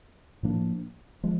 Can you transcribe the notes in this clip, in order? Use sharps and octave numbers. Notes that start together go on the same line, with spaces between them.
A2 F3 A#3 D4
F3 G#3